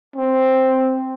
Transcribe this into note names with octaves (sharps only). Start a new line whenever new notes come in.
C4